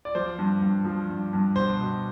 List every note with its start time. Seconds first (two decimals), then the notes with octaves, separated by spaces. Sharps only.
0.05 D5
0.15 F3 C5
0.39 G2
0.62 G2
0.85 F3
1.09 G2
1.33 G2
1.56 B2 C5
1.80 B2